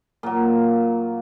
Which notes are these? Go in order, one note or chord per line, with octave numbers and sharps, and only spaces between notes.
A#2 F#3 A#3